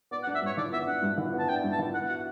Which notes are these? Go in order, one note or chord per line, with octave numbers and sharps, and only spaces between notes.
B3 D5
F#5
D4
E5
G2 C#5
E3 D5
B3 E5
D4 F#5
G2
E3
B3
A5
D4 G5
G2
A5
E3
B3 F#5
F#4 F#5